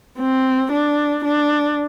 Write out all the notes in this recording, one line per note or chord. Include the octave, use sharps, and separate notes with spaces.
C4
D4
D4